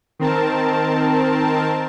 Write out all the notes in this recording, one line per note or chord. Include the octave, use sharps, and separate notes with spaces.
D#3 C4 A#4 A5